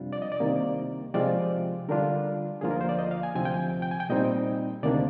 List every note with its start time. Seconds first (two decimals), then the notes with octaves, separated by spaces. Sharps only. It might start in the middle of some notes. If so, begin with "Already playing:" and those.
Already playing: F2 C3 G3 D4 F4
0.13 D5
0.22 D#5
0.32 D5
0.40 C2 C3 D#3 A#3
1.14 C3 F3 G#3 C4 F4 D5
1.89 D3 G3 D4 F4 A#4
2.61 D2 D3 F3 A#3 F4 G#4
2.71 A#4
2.81 C5
2.89 D5
2.99 D#5
3.11 F5
3.23 G#5
3.35 D2 C3 F3 C4 G#5
3.45 G5
3.54 G#5
3.82 G5
3.91 G#5
4.00 G5
4.09 A#2 G3 C4 D#4 D#5
4.83 D2 C3 D#3 A#3 D4 D5